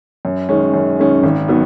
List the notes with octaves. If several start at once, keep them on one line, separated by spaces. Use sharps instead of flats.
F#2
D#3 G#3 C#4
F#2
D#3 G#3 C#4
G#1
D#3 F#3 B3